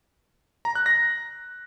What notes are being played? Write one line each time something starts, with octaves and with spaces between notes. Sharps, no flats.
A#5
F#6
A#6